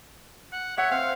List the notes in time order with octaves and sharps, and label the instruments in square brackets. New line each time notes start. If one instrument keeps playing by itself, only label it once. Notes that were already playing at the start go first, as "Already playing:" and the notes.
[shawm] F#5
[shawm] C#5 [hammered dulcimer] E5 F#5
[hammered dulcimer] C4 [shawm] F5